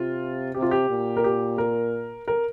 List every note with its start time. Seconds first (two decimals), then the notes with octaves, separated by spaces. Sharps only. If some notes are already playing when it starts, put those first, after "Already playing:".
Already playing: C3 F4
0.54 C3 G4
0.62 F4
0.71 G4
0.90 A#2
1.17 A#4
1.24 G4
1.58 A#4
2.28 A#4